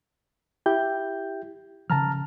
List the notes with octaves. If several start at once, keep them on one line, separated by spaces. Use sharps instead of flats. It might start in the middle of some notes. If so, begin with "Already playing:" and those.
E4 G4 G6
C#3 F3 A5 A#5 F6